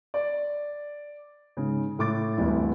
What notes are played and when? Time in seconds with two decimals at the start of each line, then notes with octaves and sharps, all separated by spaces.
0.14 D5
1.57 G#2 C#3
1.99 A2 D6 A6
2.37 D1 A1 G2 E4